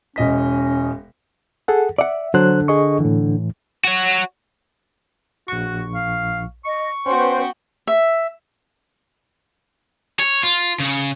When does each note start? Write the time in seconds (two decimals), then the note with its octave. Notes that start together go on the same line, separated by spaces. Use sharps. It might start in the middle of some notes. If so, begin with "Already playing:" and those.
0.16 E1 C#4 D#5 B6
1.68 G#4 A4 F#5
1.98 D5 E5 F#5
2.34 D3 F#3 C5 F#6
2.68 G#4 D#5 C#6
3.00 A2 E3
3.84 F#4 C#5
5.48 A#1 F#4 C#6
5.95 F5
6.65 D#5 C#6
7.06 B3 C#4 F#4 B4 C5 G5 C6
7.87 E5
10.20 C#5
10.43 F4
10.80 C#3